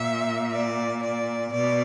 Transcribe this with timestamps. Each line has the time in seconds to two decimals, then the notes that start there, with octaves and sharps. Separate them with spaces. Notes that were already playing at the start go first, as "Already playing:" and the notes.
Already playing: A#2 E5
0.52 D5
1.03 D5
1.52 B2 D5